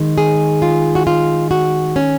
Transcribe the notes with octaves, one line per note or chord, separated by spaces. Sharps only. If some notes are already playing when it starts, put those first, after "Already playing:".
Already playing: D#3 G#3
G#4
F4
F#4
F4
F#4
C#4